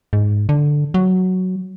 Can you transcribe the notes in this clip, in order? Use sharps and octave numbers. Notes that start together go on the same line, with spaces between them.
G#2
D3
F#3